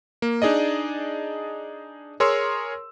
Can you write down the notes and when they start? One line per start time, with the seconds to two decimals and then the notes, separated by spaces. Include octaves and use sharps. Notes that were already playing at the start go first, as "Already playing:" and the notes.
0.22 A#3
0.42 D4 D#4 G#4 D5 D#5
2.20 G#4 A#4 C#5 C6 E6